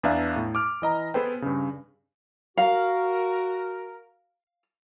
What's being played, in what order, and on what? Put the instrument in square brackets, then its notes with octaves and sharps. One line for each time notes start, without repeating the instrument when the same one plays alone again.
[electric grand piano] E2 B3 D4 E5 F5 A6
A2
D6 F6
E3 D#5 A#5
B3 G#4 A4 B4 C5 G5
G2 C#3
[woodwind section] F#4 A#4 [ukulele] F5